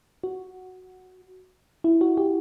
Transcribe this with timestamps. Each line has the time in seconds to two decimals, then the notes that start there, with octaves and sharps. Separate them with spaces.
0.24 F#4
1.84 E4
2.01 F#4
2.17 G4